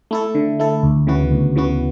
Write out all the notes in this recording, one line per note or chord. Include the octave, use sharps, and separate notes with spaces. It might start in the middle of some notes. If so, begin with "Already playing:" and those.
A3 E4 A4
D3
A3 E4 A4
D2
C#3 E3 B3 F#4
D2
C#3 E3 B3 F#4